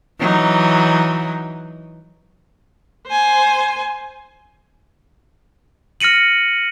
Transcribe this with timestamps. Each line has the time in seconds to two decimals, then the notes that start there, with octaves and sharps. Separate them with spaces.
0.19 E3 F#3 D#4
3.08 C5 G#5
6.00 F6 A#6 C#7 D#7 F#7